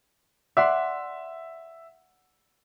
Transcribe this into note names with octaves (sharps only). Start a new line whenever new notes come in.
D5 E5 F#5 C6